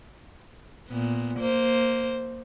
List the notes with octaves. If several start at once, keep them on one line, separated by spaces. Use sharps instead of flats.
A#2 B3
A#3 C5